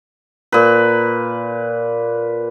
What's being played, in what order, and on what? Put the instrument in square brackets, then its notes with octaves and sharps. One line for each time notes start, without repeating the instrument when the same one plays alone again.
[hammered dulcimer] A#2 B4